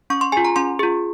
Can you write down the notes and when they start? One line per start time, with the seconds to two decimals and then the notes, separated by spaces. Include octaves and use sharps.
0.10 C#4 C#6
0.21 C6
0.32 F4 G#4 G#5
0.45 A#5
0.56 C#4 C6
0.79 F4 G#4